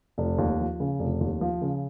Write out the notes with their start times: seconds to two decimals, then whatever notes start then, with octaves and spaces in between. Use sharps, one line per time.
0.18 F1
0.38 D#2
0.60 F3
0.80 C#3
0.99 F1
1.21 D#2
1.41 F3
1.61 C#3